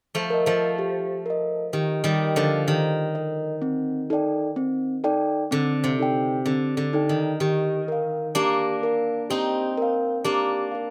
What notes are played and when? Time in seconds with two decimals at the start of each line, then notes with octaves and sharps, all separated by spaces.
0.15 F3 A3
0.30 A#4 D#5
0.46 F3 A3
0.79 G4
1.26 A#4 D#5
1.73 D#3 G4
2.04 D#3 G3
2.21 A#4 D#5
2.36 D3 F3
2.68 D#3 G4
3.15 A#4 D#5
3.62 C4
4.10 D#4 A4 D5 G5
4.56 C4
5.04 D#4 A4 D5 G5
5.51 D3 C4
5.84 C3
5.99 D#4 A4 D5 G5
6.46 D3 C4
6.77 D3
6.93 D#4 A4 D5 G5
7.09 D#3
7.40 D#3 G4
7.88 A#4 F5
8.35 A#3 D4 G4
8.83 A#4 F5
9.30 C4 D#4 G4
9.78 A#4 F5
10.24 A#3 D4 G4
10.71 A#4 F5